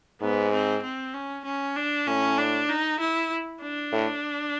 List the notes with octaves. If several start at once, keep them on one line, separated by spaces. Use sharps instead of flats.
G#2 B3
C4
C4
C#4
C#4
D4
A2 C#4
D4
D#4
E4
D4
A2